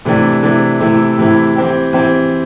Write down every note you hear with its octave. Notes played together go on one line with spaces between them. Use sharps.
C3 E3 A3 D4 G4
C3 E3 A3 D4 G4
C3 E3 A3 E4 G4
C3 E3 A3 E4 G4
E3 C4 G4
E3 C4 G4